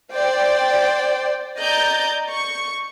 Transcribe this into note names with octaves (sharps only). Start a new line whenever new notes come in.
C5 D5 G5
D5 D#5 A#5 G6 A6
C#6